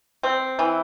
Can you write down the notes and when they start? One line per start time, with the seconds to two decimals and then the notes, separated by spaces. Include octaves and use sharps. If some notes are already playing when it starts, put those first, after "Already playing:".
0.23 C4
0.59 E3